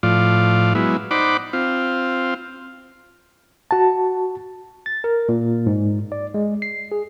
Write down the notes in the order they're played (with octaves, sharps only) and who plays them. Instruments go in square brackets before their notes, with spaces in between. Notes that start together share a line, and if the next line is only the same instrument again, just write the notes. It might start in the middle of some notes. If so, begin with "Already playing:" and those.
[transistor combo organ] A2 F3 F4 D5
F#3 G#3 B3 E4
D#4 C5 D5 F#5 B5 D6
C4 F4
[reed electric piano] F#4 A5
[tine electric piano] A6
A#4
A#2
G#2
D5
G#3
C7
G#4